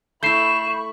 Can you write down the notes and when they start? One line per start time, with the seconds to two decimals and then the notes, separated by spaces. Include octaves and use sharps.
0.23 A3 E4 B5 C#6 G6 C7 E7